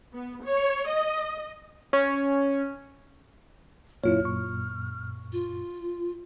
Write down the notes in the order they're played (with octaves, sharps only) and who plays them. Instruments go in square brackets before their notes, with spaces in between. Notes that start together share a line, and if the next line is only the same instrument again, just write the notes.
[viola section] B3
C#5
D#5
[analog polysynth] C#4
[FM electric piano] F#2 A#2 [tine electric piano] E4 F4 C#5 [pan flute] F6
[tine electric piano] C#6
[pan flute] F4